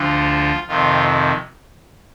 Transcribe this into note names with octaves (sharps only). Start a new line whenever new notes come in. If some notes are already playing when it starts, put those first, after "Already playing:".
Already playing: D2 D3 F3 F4
F2 C3 D#3 F4